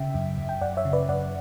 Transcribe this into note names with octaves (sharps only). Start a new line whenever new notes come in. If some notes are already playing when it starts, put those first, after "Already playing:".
Already playing: C#3 E5 G5
F#2
F#2
G5
F#2 D5 F#5
C#5 E5
C#3
B4 D5
F#2 D5 F#5